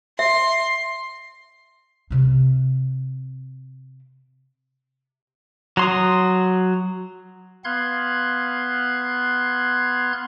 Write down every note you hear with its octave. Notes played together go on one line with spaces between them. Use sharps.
E5 C6
C3 C4
F#3 C6 D#6
B3 F5 C6 F#6 G#6